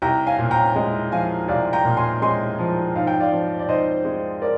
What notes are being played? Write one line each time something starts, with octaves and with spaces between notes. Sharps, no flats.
C2 G5 A#5
F5 G#5
A#2
G5 A#5
G#3
F3 F5 G#5
C2 D5 F5
G5 A#5
A#2
G#5 C6
G#3 G#5 C6
F3
G#2 F5
G5
D5 F5
F3
D5
G#2 C5 D#5
G#3
A#4 D5